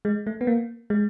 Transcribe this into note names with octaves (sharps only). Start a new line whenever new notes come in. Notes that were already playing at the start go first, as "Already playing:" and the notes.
G#3
A3
B3
A#3
G#3